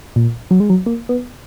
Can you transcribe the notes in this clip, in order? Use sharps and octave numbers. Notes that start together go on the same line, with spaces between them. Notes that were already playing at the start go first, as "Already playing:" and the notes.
A#2
F#3
G#3
F#3
A#3
B3